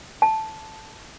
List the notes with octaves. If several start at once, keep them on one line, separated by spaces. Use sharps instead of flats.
A5